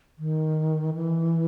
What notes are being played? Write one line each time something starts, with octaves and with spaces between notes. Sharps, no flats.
D#3
E3